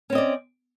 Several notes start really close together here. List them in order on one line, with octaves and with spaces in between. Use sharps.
C#4 C4 D#5 D5